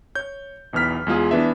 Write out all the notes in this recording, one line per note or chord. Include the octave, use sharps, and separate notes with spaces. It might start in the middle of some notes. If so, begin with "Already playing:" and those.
C#5 G6
B1 E2 E3 F6 B6
E2 G#3 F4 G#4
E3 B3 D4 E5